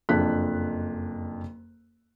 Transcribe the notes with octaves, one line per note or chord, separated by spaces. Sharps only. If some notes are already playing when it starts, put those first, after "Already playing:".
F#1 F2 D4 F#6 B6